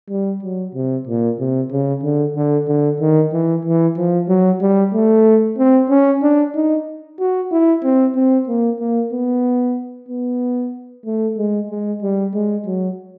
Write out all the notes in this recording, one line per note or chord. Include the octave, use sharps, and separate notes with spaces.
G3
F#3
C3
A#2
C3
C#3
D3
D3
D3
D#3
E3
E3
F3
F#3
G3
A3
C4
C#4
D4
D#4
F#4
E4
C4
C4
A#3
A#3
B3
B3
A3
G#3
G#3
G3
G#3
F#3